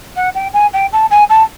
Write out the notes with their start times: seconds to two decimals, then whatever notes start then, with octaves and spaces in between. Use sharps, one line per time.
0.15 F#5
0.34 G5
0.53 G#5
0.73 G5
0.92 A5
1.10 G#5
1.29 A5